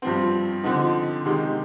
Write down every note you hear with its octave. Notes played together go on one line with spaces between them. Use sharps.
G2 F3 C4
D3 F3 C4 D#4
C3 D#3 G#3 D#4 G4